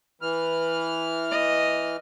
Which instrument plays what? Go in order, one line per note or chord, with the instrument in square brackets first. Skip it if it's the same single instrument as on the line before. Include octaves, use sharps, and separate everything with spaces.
[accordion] E3 F6 [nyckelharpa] B4
[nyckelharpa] D#5